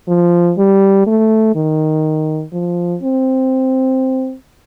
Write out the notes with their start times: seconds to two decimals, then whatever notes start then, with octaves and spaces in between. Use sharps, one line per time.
0.09 F3
0.58 G3
1.07 A3
1.56 D#3
2.53 F3
3.03 C4